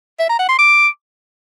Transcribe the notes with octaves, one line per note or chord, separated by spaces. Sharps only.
E5
A#5
F#5
C6
D6